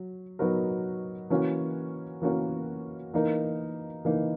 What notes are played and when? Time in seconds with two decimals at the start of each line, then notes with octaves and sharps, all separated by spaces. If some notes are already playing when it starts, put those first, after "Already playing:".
Already playing: F#3
0.39 F#3 B3 D#4 F#4 A#4
1.30 E3 A#3 C#4 F#4 A#4
2.22 E3 A#3 C#4 F#4 A#4
3.14 E3 A#3 D#4 A#4
4.05 E3 A#3 D#4 A#4